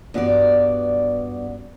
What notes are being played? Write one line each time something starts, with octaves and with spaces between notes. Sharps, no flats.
G2 B3 F#4 G#4 D5